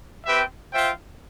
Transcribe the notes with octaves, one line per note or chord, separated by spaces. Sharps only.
C4 G4 B4 E5 G5
F4 C5 E5 G5